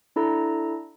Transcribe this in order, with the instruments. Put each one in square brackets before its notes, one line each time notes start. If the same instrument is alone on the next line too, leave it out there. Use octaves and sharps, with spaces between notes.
[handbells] D4 E4 A4 A#5